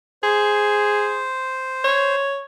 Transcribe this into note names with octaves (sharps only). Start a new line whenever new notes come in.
G#4 C5
C#5